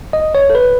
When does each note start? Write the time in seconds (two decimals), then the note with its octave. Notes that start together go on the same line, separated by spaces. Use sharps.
0.13 D#5
0.35 C#5
0.50 A4
0.55 B4